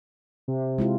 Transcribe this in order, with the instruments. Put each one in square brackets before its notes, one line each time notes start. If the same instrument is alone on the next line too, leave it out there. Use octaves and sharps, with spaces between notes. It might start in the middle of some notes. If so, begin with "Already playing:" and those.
[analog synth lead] C3
[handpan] G#3 E4 F4